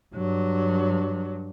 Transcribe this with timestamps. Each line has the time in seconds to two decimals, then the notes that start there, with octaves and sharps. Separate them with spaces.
0.16 G2 F#3